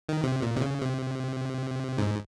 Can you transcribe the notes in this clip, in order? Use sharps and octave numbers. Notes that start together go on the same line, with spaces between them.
D#3
C3
A#2
C3
C#3
C3
G#2